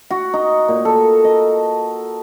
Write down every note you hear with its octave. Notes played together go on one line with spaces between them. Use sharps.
F#4
D#4
A#2
A4
D#5